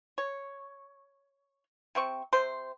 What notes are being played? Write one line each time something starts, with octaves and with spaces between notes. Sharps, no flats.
C#5
C3 C4 C#6
C3 C5